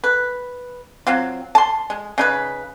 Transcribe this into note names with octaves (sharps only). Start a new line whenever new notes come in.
B4
F#3 C4 F4
A5 C6
G#3
C#3 D#4 B4